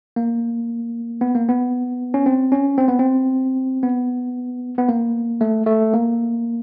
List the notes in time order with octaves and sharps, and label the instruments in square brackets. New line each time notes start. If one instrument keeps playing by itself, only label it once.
[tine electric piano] A#3
B3
A#3
B3
C#4
C4
C#4
C4
B3
C4
B3
B3
A#3
A3
A3
A#3